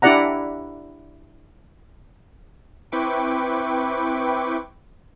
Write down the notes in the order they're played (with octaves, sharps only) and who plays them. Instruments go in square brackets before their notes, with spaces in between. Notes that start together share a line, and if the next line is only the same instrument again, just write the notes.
[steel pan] D4 E4 G4 D5 F#5 A#5
[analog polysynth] C4 E4 B4 G5 C#6 D6